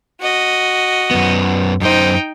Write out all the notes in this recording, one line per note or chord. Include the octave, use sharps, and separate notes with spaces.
F#4 D#5
F#2 B3
F#2 D#4 C5 G5